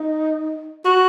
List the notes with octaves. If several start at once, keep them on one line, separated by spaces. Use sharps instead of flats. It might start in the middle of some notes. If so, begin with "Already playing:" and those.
Already playing: D#4
F#4